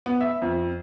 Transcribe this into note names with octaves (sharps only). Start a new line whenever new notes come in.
B3
E5
F2